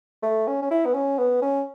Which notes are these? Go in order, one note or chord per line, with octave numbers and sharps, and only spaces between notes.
A3
C#4
C#4
E4
B3
C#4
B3
C#4